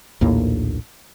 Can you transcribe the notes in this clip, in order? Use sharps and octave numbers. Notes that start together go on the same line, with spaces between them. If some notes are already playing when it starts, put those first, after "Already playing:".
A#1 D#2 A2 A#3